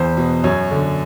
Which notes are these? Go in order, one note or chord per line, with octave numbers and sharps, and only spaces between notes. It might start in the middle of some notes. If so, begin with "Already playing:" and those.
Already playing: E2 C5
B2
F#2 C#5
D3